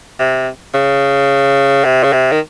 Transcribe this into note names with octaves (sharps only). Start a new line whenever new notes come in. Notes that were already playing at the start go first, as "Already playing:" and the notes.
C3
C#3
C3
C#3
C3
D#3